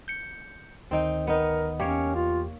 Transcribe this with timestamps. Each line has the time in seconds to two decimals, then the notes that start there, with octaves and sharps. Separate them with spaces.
0.08 G6 C#7
0.91 D2 D#3 C4 D#4 G5
1.27 B3 D#4 A#4
1.80 E2 A#3 C#4 G4 C#5
2.15 F4